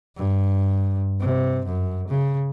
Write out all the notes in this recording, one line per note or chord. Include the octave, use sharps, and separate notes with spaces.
G2
C3
F#2
C#3